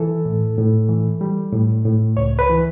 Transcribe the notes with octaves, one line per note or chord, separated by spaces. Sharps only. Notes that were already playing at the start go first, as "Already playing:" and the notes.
Already playing: E3 A4
A2
A2
E3
G3
A2
A2
C#2 C#5
B4
E3